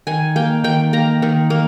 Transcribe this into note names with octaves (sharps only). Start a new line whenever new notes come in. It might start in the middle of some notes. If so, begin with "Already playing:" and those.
D#3 G#5
A#3 G5
D#3 G5
A#3 A#5
D#3
A#3